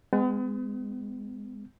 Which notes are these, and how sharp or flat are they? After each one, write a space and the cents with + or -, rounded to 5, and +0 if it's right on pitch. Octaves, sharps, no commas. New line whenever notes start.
G#3 -10 B3 +40